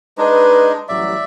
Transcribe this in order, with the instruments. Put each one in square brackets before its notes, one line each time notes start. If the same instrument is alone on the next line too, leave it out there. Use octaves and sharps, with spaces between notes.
[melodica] G#3 D4 D#4 [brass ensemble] B4
[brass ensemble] A1 F#3 G3 [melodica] D5 E5